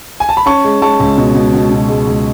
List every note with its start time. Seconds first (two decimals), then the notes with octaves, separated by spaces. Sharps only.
0.20 G#5
0.29 A5
0.37 B5
0.46 C#4 A5 C#6
0.64 G#3
0.81 G#3 A5 C#6
1.00 C#2
1.18 B2
1.35 B2
1.54 B2
1.71 B2
1.89 G#3
2.07 C#2